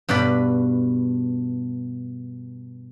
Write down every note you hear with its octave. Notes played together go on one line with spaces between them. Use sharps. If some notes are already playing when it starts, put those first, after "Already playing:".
G2 B2 B4 D5 B5